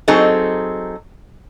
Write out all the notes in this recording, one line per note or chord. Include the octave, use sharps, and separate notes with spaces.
F#3 C4 D#4 G#4 A4